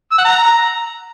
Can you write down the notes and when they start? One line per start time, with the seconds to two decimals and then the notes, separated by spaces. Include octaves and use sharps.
0.11 E6
0.18 F#5
0.25 A#5